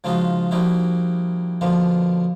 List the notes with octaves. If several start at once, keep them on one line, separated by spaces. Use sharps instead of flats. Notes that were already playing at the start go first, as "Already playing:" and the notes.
C#3 F3 G#3 D#4 F4 F#4
F3 G3 A#3 D#4 E4 F#4
B2 D3 F3 A#3 B3